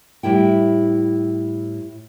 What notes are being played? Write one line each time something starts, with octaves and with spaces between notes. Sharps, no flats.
A2 G3 E4 G5